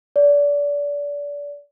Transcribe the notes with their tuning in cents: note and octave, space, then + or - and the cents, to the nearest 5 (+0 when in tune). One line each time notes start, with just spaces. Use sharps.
D5 -30